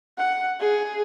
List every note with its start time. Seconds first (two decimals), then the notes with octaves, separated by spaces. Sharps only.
0.18 F#5
0.60 G#4